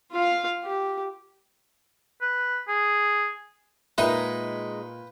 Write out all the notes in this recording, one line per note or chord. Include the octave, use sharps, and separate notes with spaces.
F4 F5
G4
B4
G#4
A#2 G#3 D#4 A#4 B4 E5 G5 B5